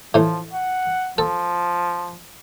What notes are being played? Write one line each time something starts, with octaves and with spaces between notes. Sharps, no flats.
A2 E3 F3
F#5
F3 A4